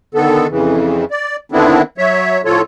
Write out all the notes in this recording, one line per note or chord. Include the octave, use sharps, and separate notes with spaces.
D3 D#3 B3 A4
F2 C#3 E3
D5
D3 D#3 B3 C4 D4 E4
F#3 C#5 E5
A2 F3 F4 A4 C#5